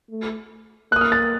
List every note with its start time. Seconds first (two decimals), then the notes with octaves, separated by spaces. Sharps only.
0.10 A3
0.92 A#3 F#6
0.96 D#6
1.01 F6
1.12 A6